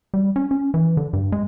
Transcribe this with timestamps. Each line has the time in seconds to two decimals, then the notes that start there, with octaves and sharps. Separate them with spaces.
0.14 G3
0.36 C#4
0.51 C#4
0.74 E3
0.97 D3
1.13 G2
1.32 G#3